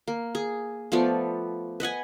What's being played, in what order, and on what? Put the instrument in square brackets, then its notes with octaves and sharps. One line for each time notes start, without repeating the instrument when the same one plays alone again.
[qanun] A#3
G#4
F3 A3 B3 D5
B4 D#5 F#5 G#5